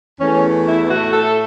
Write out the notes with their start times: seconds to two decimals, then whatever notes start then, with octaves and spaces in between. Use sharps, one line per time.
0.19 E2 E3 A3 C#4
0.66 E4
0.89 A2 A3 F#4
1.12 A4